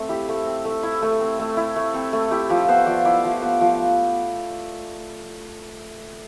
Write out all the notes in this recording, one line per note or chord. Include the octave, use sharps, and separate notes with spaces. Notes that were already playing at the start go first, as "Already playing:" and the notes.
Already playing: A3 C4
E4 G4
A3
C4
A3
E4
A3
C4
A3
E4
A3
C4
A3
E4 G4
F3 G4
B3 C5
F3 D5
E4 D5
F3
B3
F3